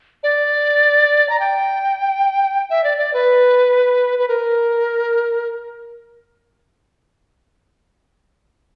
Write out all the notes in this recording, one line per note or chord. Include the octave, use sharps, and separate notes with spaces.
D5
A#5
G5
E5
D5
D5
B4
B4
A#4